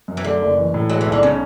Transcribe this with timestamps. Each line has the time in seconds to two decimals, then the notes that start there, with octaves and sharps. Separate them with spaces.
0.08 F#2
0.17 E3
0.24 D3 A3
0.42 F#1
0.58 E3
0.74 A2
0.89 F#3 G#3
1.01 E3
1.06 B1
1.12 D3
1.23 C#3 C#4